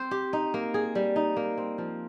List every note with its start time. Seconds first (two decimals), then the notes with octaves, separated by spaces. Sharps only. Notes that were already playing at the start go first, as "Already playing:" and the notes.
Already playing: C4 C5
0.11 G4
0.33 D#4
0.54 A#3
0.74 G#4
0.95 G3
1.16 D#4
1.37 A#3
1.57 C4
1.78 F3